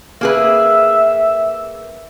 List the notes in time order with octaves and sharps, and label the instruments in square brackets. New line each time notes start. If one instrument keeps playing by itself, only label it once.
[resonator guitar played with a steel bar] A#3 G#4 B4 [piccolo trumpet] E5